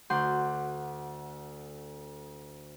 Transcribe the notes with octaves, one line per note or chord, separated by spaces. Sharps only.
D2 F#5 C6 G6